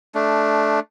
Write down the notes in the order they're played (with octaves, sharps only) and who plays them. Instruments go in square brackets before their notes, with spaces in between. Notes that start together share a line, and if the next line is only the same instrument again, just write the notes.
[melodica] A3 D4